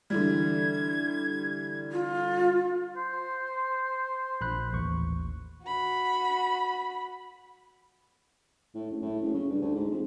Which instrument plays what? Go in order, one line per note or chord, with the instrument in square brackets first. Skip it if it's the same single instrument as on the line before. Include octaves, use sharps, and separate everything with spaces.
[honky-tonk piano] D3 E3 G3 [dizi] G#6
[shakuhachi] F4
[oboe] C5
[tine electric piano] A#1 B5 F#6
A1 D#2 C#6
[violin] F#4 B5
[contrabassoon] A2
F#1
A2
F#1
C#3
G2
D2
G#2
F2